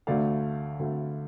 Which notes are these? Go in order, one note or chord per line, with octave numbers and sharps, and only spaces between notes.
D2 D3 A3 D5 F5
D2 D3 A3